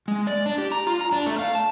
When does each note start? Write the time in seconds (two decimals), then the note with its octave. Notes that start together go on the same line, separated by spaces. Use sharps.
0.08 G#3
0.27 D5
0.46 D4
0.58 G4
0.72 A#5
0.87 F4
1.01 A#5
1.12 D4
1.26 A3
1.39 F5
1.55 A5